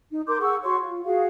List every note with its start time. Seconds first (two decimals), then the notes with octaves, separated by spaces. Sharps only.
0.11 D#4
0.28 A#4 C6 D6 G6
0.40 G#4 F#5 C#6 E6
0.64 F#4 C#5 C6 C#6
0.82 F4
1.04 F#4 G#4 F5